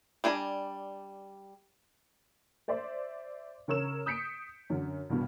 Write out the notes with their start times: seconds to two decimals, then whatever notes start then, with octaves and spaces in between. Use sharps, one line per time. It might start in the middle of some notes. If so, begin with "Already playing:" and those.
0.24 G3 D4 G#5 A#5
2.68 C5 D5 E5 C6
3.68 C#3 A#4 C#5 E6 E7
4.06 D#6 G6 B6 C#7 D7
4.70 F#2 D3
5.10 C2 G2 B2